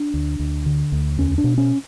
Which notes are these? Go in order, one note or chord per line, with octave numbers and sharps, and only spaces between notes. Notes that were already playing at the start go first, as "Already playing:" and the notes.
Already playing: D4
D2
D2
D3
D2
E2 C#4
D4
B2
C#4